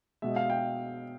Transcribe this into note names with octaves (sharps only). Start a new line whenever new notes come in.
B2 G#3 E5
F5
G5